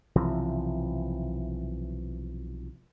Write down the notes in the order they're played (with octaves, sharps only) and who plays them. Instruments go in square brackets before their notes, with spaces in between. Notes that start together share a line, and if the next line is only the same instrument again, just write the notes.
[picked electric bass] B1 C3 E3 F3